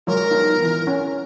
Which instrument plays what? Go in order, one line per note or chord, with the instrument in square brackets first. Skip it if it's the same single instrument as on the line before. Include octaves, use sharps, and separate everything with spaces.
[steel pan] F#3 G#3 F4 [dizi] A#4
[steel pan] B3 D#4 F4
D#3 E3
C#4